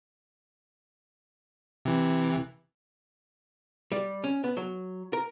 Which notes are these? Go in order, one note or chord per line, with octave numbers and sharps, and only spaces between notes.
C3 E3
G3
C#4
B3
F#3
A#4